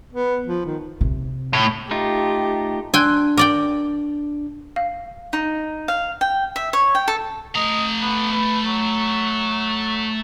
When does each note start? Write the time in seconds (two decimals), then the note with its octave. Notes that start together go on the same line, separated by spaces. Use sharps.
0.13 B3
0.47 F3
0.66 D#3
1.01 C3
1.53 A2
1.91 A3 D#4 F4 G4
2.94 D4 G5 G#5 C6 E6 F#6 G#6
3.37 A#4 D5 G5 D6
4.76 F5
5.33 D#4
5.88 F5
6.21 G5
6.56 E5
6.73 C#5
6.95 G5
7.08 A4
7.55 A3 D#5 A#5
8.01 B3
8.32 B4
8.65 F#3